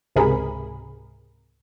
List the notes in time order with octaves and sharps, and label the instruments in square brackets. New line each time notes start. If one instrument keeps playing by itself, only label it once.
[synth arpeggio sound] C#2 G#2 C3 G#4 A#4 B5